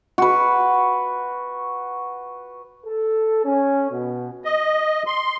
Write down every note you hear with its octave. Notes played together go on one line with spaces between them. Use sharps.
F#4 B4
A4
C#4
B2
D#5
C6